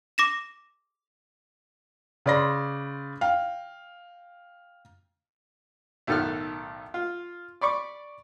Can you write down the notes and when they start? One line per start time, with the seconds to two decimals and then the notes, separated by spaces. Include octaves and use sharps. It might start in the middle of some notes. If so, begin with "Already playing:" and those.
0.18 D6 A#6 E7
2.26 C#3 B4 D5 C6 A#6
3.21 F5 G5
6.07 B1 A2 D#3 A4 F#5 F6
6.94 F4
7.61 D5 B5 C#6 D6